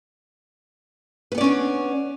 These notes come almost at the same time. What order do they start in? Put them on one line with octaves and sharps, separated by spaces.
B4 B3 D5 C#4 D4